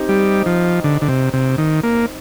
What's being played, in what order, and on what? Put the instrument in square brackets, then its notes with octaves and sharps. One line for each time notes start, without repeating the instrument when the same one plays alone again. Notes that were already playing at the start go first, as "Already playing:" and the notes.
Already playing: [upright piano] C4 D#4 G4
[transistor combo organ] G3
F3
D3
D3
C3
C3
D#3
A#3